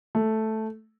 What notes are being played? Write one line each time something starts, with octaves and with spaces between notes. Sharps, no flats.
A3